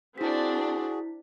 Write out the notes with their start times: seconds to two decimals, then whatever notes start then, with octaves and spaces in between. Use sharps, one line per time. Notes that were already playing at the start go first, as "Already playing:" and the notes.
0.18 C4 D4 E4 F#4 G#4 B6